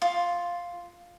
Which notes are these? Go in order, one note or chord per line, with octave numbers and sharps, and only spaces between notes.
F4